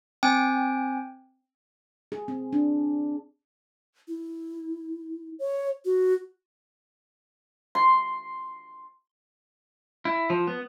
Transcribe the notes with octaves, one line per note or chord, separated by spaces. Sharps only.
C4 G5 G#5
G#4
C4
D4
E4
C#5
F#4
C6
E4
F3
B3